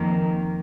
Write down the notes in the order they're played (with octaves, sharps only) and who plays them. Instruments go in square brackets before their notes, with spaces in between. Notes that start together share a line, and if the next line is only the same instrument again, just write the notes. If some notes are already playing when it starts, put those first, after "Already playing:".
Already playing: [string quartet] F2 D#3 A#3